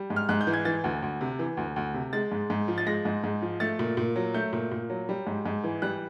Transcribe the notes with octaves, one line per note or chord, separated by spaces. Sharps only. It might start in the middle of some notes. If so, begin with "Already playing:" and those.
Already playing: G3
G#2
F6
G#2 F#6
G6
E3
G#6
E3 A6
D2
D2
C3
E3
D2
D2
C3
G#3 A6
G#2
G#2
F3
A6
G#3 A#6
G#2
G#2
F3
A3 A6
A#2
A#2
F#3
A3 G6
A#2
A#2
F#3
G3
G#2
G#2
E3
G3 F#6